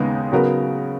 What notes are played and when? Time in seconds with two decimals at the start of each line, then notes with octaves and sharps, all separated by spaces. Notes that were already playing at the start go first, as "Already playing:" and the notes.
Already playing: D#2 C#3 G#3 B3 D#4
0.32 C#3 F#3 B3 F#4 A#4